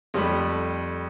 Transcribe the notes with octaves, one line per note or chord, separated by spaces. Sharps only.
F2 G3 A3 B5